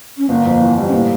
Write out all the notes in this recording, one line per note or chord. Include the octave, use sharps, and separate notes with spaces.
C#4
G1 A#3
F2
E3
G3
C#4
A2 A#3